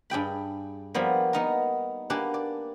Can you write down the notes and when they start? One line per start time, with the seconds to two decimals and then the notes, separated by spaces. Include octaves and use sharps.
0.10 G2 G#4 G5 B5
0.94 F3 G3 A#3 B3
1.33 B3 D#4 A#4
2.10 A#3 D4 G4 B4 F#5 G#5
2.34 D5